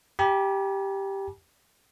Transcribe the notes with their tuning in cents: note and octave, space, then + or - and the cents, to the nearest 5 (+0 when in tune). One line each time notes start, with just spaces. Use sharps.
G4 +0 G#5 +45 B5 -45